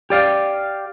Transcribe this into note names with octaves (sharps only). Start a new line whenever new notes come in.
G4 D5 F5